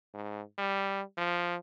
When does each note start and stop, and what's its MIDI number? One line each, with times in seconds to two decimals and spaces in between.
0.14 0.42 44
0.58 1.02 55
1.17 1.56 53